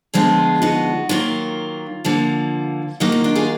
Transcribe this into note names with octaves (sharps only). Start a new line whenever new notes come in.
D3 F3 G#3 B3 F4 G#4
D#4 F#4
D#3 F#3 A#3 D4 F4
D3 F3 A#3
D#3 F#3 A#3 D#4
D#4
D4 F4
F4 G#4